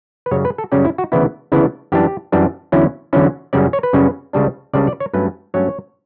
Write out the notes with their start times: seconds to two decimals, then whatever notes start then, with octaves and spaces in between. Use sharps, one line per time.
0.26 B4
0.31 F#2 C#3 G3 C#4 C#5
0.45 B4
0.58 A4
0.72 F#2 C#3 G3 C#4 D5
0.85 E4
0.98 F#4
1.12 D2 C#3 E3 B3 D4 E4
1.52 D2 C#3 E3 B3 D4 E4
1.92 F#2 E3 G3 D4 G4
2.32 F#2 E3 G3 D4
2.72 E2 D3 F#3 C#4 E4
3.13 E2 D3 F#3 C#4 E4
3.53 F#2 C#3 G3 C#4 D5
3.73 C#5
3.83 B4
3.93 F#2 C#3 G3 C#4
4.33 C#2 C#3 G3 D4
4.73 C#2 C#3 G3 D4 D5
4.87 D5
5.00 C#5
5.14 G2 F#3 A3 C#4 B4
5.54 G2 F#3 A3 C#4 C#5